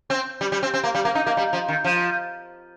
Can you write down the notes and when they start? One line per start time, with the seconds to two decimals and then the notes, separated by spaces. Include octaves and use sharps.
0.10 C4
0.41 G3
0.52 G3
0.63 C4
0.74 C4
0.84 A#3
0.95 G3
1.05 A#3
1.15 D#4
1.27 A#3
1.37 G3
1.53 F3
1.68 D#3
1.84 F3